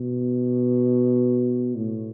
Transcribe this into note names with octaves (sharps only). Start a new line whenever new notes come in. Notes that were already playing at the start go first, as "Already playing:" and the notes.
Already playing: B2
A2